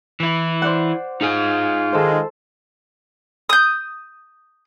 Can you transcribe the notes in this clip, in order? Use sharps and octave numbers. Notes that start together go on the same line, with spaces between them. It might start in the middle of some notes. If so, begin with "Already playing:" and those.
E3 E4
C5 D5 F#5
D#4 F4 G#4 G#5
D#3 G#3 A4 C5
D#6 G6